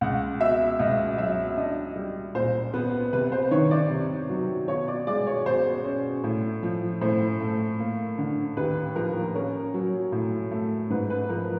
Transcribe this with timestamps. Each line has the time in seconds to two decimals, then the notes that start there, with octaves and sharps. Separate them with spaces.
0.01 C#2 F#5
0.40 B2 E5
0.79 C#2 D#5
1.18 F#3 E5
1.57 D4 D#5
1.96 G3
2.35 A#2 C5
2.74 B3 B4
3.13 C3 B4
3.32 C5
3.51 D#3 C#5
3.71 D5
3.90 C3
4.29 F#3
4.68 B2 C#5
4.88 D5
5.07 G#3 D5
5.27 C#5
5.46 B2 C5
5.85 C#4
6.24 A2
6.63 F3
7.01 A2 C5
7.41 A3
7.79 A#3
8.18 D3
8.57 D#2 B4
8.96 F3 A#4
9.35 C#4 A#4
9.74 F#3
10.12 A2
10.51 A3
10.90 G#2 B4
11.10 B4
11.29 F3 A#4